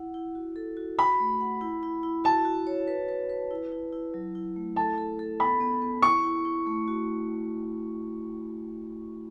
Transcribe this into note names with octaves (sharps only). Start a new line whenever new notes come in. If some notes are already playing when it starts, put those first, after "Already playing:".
Already playing: E4 F#5
E4
F#4
A4
F#4
F#4 B5
A3
F#5
E4
E4
E4
F#4 A5
F#4
C#5
B4
B4
B4
E4
E4
E4
F#3
E4
A3
A4 A5
A4
A4
B3 B5
B3
B3
E4 C#6
E4
E4
A3
F#4